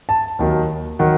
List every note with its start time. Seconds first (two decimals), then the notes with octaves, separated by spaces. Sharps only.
0.09 A5
0.39 D#2 D#3 F#3
0.99 D#3 F#3 F#5